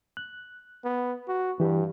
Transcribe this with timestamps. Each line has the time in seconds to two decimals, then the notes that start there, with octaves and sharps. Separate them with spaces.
0.17 F#6
0.84 B3
1.28 F#4
1.60 G2 E3 G4